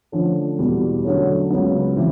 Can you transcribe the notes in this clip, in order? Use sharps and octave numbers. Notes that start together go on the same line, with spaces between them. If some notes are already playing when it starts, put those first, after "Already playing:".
D3 F3 A3 C#4
E2 B2 G3
D3 F#3 A3 C#4
C#2 C#3 F#3 B3
C3 E3